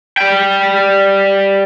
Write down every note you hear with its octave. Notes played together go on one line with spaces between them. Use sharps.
G3 G5